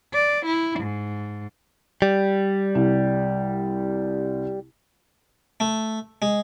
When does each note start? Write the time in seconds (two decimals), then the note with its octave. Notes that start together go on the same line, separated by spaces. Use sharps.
0.13 D5
0.46 E4
0.80 G#2
2.02 G3
2.75 C2
5.60 A3
6.22 G#3